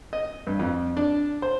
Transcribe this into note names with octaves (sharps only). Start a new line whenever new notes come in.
D#5
G2
F2
D4
C5